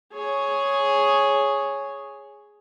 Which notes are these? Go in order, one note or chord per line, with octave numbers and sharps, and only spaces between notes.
G#4 C#5